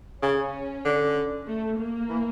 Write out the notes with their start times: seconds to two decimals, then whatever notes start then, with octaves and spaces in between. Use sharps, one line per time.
0.22 C#3 C#4
0.85 D3
1.48 A3
1.79 A#3
2.09 E3